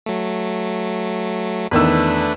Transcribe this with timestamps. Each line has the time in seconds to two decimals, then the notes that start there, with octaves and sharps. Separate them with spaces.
0.06 F#3 A3
1.71 E2 D#3 A3 D4 B4 E6